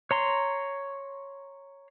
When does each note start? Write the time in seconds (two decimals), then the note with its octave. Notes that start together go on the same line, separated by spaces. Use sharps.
0.11 C#5 A#5 C6